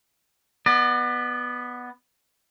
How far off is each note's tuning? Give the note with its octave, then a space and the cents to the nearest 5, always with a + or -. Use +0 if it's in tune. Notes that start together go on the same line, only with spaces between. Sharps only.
B3 +0 D5 +40